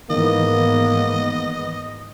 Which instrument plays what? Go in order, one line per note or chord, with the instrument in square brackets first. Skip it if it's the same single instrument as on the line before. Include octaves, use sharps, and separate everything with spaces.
[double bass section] G#2 B3 [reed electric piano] D#3 E3 [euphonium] A#3 [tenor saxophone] D#5